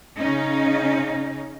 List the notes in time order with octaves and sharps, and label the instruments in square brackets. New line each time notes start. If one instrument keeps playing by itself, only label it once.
[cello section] C#3 C#4 D#4